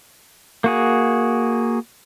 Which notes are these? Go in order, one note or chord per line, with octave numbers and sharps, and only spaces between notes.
A#3 F#4 G#4